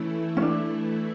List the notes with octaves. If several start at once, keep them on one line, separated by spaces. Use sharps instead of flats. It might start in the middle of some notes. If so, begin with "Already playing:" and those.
Already playing: E3 A3 C#4 E4
C#4
D4